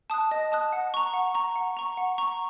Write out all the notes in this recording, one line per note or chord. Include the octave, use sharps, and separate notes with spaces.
A5 D#6 F#6
D#5
A5 D#6 F#6
F#5
A#5 C#6
F#5
A#5 C#6
F#5
A#5 C#6
F#5
A#5 C#6